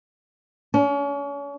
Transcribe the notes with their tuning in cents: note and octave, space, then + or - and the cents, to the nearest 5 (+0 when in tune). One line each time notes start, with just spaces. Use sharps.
C#4 +35